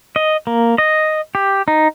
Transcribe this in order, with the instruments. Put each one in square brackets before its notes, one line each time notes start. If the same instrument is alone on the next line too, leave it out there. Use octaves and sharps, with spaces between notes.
[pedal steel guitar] D#5
A#3
D#5
G4
D#4